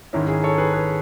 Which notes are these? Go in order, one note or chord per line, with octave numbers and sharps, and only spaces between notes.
G#2 D#3 C#4 E4
E4 G#4
A4 C#5
G#4 B4
G#4 B4